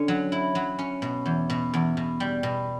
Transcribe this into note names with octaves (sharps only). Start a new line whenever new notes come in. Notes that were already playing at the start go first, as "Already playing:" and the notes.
Already playing: D3 C#4
F#3
E4
F#3
C#4
B2
E2
B2
E2
B2
G3
B2